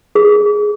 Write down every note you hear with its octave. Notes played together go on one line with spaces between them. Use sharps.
G#4